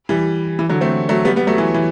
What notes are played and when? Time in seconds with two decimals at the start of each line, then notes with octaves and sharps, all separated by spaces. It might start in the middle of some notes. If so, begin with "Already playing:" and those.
0.09 E3 G3
0.59 E3
0.70 D3 F#3
0.81 A3 C4
1.09 F#3 A3
1.25 G3 B3
1.36 G3 B3
1.47 F#3 A3
1.58 E3
1.74 E3